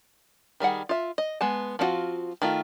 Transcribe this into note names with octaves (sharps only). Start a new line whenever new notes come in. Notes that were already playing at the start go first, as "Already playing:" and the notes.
D#3 G3 G#4 F#5
F4 E5
D#5
G#3 B3 A5
F3 C4 D4 F4 F#4
D#3 A3 F4